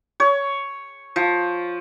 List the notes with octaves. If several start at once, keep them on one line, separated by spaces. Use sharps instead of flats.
C#5
F3